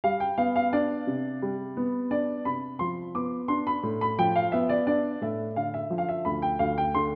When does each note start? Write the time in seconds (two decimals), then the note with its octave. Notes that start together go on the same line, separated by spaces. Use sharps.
0.04 G3 F5
0.20 G5
0.38 B3 F5
0.56 F5
0.73 D4 D5
1.07 C3
1.42 G3
1.77 B3
2.10 D4 D5
2.45 C3 B5
2.79 F3 C6
3.15 B3 D6
3.48 D4 C6
3.67 B5
3.83 A2
4.01 B5
4.19 F3 G5
4.36 F5
4.52 B3 E5
4.69 D5
4.87 D4 D5
5.21 A2 E5
5.56 D3 F5
5.74 E5
5.90 F3
5.98 F5
6.09 E5
6.25 D2 B5
6.42 G5
6.59 D2 F5
6.78 G5
6.94 D3 C6